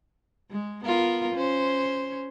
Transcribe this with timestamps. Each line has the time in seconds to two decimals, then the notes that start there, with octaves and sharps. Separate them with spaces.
0.51 G#3
0.84 B3 F4 A#4
1.34 C#4 C5